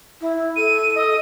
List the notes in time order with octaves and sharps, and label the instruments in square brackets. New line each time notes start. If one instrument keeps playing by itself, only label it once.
[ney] E4
[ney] A4 [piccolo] D#7
[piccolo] D#5